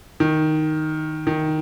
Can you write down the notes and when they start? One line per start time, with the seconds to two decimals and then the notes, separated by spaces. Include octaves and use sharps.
0.20 D#3
1.27 D#3